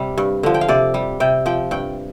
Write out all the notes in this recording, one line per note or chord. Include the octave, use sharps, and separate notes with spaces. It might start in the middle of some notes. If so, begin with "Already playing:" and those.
Already playing: C3 G3
G2
D3 F3
G5
F5
C3 D5
G3
C3 G5
F3 G5
G2 G5